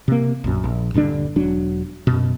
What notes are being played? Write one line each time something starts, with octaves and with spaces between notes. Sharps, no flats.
C3 A#3
A#1 F#2
A#1
D#1 G2 D3 D4
E1 F#3 D4
F#2 B2